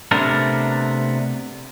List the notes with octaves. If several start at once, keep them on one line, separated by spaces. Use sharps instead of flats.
C3 A3 B3 D4 A#4